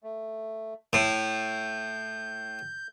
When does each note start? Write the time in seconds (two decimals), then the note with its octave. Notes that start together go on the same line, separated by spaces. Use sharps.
0.03 A3
0.93 A2 G6